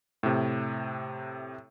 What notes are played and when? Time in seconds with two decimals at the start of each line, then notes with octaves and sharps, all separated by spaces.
0.23 A2 C3